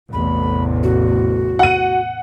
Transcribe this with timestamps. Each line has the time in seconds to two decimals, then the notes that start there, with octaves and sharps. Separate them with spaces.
0.13 A1 E2 C3 B5
0.83 F#4
1.59 F#5 D#7